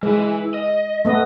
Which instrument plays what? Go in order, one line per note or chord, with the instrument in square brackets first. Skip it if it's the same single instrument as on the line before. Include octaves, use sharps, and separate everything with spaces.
[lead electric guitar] E3 E4 [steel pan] G#3
[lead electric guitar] D#5
[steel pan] A3 B3 D#5